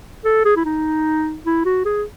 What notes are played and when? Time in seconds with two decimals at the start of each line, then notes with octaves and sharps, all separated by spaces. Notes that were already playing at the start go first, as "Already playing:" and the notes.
0.25 A4
0.45 G#4
0.57 E4
0.65 D#4
1.46 E4
1.65 F#4
1.85 G#4